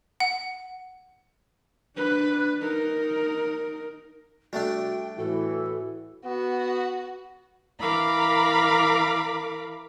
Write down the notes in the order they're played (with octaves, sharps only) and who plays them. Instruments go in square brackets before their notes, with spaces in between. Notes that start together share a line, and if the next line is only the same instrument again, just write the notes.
[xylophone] F#5
[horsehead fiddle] D4 B4
D#4 A#4
[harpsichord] G3 A3 D4 [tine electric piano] F#4 [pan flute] G5
[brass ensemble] A2 E3 [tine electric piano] F#4 [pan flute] A4
[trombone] B3 [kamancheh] F#4
[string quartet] E3 A#4 F5 B5 D6